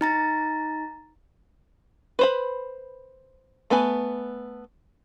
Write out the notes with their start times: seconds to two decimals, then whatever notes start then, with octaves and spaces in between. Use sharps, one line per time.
0.01 D#4 A#5 A6
2.19 B4 C5 B5
3.70 A3 B3 B4 G#5